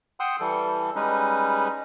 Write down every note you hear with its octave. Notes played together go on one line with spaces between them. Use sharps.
F#5 G5 C6 D#6 E6 F#6
E3 G3 A4
G3 G#3 C#4 D#4 B4